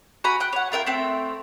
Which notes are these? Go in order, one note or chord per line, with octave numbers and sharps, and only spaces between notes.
F#4 G#5 A#5 B5
G5 F#6
C#5 F#5
F4 A#4 E5 G5
A3 C4 G5